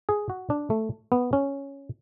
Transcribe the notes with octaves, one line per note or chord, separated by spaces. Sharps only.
G#4
F#4
D4
A3
B3
C#4